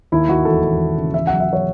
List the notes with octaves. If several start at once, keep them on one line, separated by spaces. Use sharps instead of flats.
D#2 E4
D#2 F#4
E1 A4
E1
D#2
C#3
E2 E5
F#3 F#5
E5
F#3 C#5